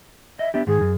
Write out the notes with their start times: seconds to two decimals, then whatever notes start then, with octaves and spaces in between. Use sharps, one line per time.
0.39 D#5 E5
0.54 B3 D4 G4 E5
0.67 G#2 D#3 G#4
0.81 F#2